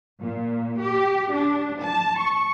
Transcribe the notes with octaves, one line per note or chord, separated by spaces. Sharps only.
A#2
G4
D4
A5
C#6